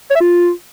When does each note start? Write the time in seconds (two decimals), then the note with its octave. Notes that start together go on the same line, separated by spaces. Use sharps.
0.10 C#5
0.15 E5
0.20 F4